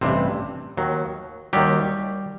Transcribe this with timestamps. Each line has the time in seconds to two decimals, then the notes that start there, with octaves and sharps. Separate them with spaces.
0.01 A1 G2 C3 E3 C4
0.77 D#2 D#3 F#3
1.53 D#2 D#3 F#3 G3 G4